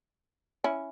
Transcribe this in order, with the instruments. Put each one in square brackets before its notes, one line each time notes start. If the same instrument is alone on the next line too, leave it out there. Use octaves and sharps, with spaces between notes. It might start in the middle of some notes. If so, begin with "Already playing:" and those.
[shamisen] C#4 E4